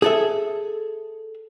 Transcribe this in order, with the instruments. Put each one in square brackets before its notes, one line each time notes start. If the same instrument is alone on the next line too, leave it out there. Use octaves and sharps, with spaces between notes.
[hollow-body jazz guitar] G#4 A4 E5